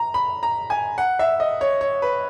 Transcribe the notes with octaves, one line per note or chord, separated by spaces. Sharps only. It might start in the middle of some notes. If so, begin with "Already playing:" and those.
Already playing: A#5
B5
A#5
G#5
F#5
E5
D#5
C#5
C#5
B4